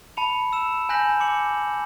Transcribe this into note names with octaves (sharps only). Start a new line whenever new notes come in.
A5 B5 C#7 F7
E6 E7
G#5 F#6 G6 A#6 B6 F#7
D6 C#7 F#7